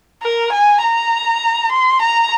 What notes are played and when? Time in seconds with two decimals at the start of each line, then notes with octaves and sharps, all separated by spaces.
0.23 A#4
0.53 G#5
0.83 A#5
1.72 C6
2.02 A#5